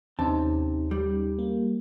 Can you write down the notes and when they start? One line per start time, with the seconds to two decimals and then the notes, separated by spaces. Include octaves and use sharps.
0.19 D#2 C3 C4 C#4 D#4 A5
0.91 G3
1.39 A#3